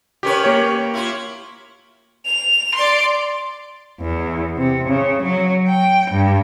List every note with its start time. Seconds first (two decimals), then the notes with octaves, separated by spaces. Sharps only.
0.23 D#3 C#4 G4 B4
0.44 A#3 G4 C#5
0.94 E4 F4
2.25 F7
2.75 D5 C6
4.00 E2
4.57 C3
4.89 C#3
5.23 F#3
5.68 G5
6.11 G2